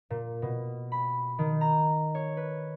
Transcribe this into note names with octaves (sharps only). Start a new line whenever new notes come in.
A#2
B2
B5
D#3
A#5
C#5
B4